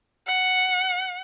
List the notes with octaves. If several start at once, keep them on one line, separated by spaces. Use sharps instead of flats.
F#5